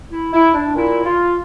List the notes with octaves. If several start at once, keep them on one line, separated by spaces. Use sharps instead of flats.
E4
E4
D4
A#2 E4
F4